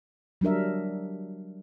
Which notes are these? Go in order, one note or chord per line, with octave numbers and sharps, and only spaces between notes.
F#3 G3 D4 A#4 E5